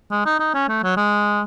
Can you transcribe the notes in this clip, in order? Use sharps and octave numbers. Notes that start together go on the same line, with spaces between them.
G#3
D#4
D#4
C#4
A3
F#3
G#3